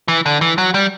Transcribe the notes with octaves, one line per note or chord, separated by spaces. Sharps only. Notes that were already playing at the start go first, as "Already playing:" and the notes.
E3
D3
E3
F#3
G3